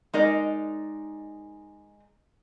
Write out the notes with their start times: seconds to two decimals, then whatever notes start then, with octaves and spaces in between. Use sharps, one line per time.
0.14 G#3 D#4 A#4 D5